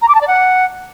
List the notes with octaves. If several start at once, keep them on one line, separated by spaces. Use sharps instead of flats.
A#5
D6
A5
D5
F#5